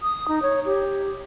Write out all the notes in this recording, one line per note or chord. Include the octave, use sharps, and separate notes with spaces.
D#6
D#4
C#5
G4